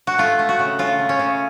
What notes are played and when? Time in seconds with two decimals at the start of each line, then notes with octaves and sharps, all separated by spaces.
0.07 F#4
0.18 A3 F4
0.39 A3
0.49 F#4
0.59 C#3
0.79 C#3 F4
0.99 A3
1.09 C#4
1.19 C#3